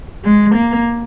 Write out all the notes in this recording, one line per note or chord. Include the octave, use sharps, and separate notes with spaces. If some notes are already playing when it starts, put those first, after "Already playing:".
G#3
A#3